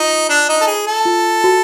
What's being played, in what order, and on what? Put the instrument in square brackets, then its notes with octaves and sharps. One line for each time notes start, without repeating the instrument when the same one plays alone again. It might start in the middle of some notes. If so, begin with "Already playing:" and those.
Already playing: [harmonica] D#4 [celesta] F4
[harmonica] D4
D#4
A4
G#4
A4
[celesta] F4
F#4